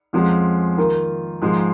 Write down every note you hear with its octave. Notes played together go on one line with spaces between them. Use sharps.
F2 F3 G#3 C#4 F#4
D#3 A#3 F4
G#2 F3 G#3